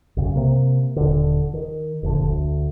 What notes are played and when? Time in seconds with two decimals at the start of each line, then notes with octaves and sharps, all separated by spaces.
0.17 B1 F#2 C#3
0.36 C3 A#3
0.96 D#1 D3
1.54 D#3
2.03 F1 A#1 D3
2.27 D2